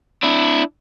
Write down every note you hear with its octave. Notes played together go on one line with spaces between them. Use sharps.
D4 E4